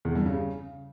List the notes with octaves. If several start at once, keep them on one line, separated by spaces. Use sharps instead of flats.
E2
G2
C#3